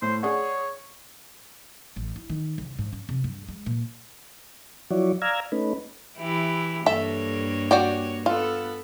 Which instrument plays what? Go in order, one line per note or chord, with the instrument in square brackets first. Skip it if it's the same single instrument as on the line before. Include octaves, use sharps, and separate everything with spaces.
[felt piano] A2 [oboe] C5
[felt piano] G#4 D5 F#5 [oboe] C#5
[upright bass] A1
E4
D#3
C2
G#2
C#4
C3
G2
G#3
A#2
[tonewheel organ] F3 F#3 E4 F#4 C#5 D5
D5 F5 A#5 E6 F6 G#6
A3 C#4 D#4 B4
[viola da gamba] E3 E4 G4
[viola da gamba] G2 A#3 C#5 [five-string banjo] A4 E5
[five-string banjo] F#4 D5 G5
[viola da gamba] B3 A4 [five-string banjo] F4